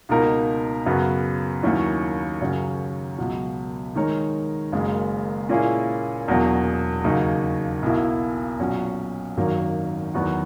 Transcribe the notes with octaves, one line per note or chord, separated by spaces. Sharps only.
C#2 B2 A#3 D#4 A#4
F#2 C#3 F#3 B3
D#2 D#3 F#3 C#4 E4
F#2 C#3 F#3 C#4
C#2 B2 F#3
D#3 G#3 D#4 A#4 C#5
F#1 F#2 C#3 G#3
A#2 A#3 C#4 E4 G#4
E1 E2 B2 F#3 A#3
D#2 C#3 F#3 A#3 D#4
B1 B2 A#3 E4
B1 A#2 F#3 C#4 F#4
G#1 F#2 D#3 F#3 A#3
E2 D#3 F#3 B3 F#4